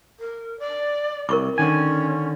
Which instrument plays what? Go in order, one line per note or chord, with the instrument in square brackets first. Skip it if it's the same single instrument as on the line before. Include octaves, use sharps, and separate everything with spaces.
[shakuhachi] A#4
D5
[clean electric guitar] C2 [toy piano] A#4 C#6 D6
[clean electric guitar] D3 D#3 G#5 [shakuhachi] C#4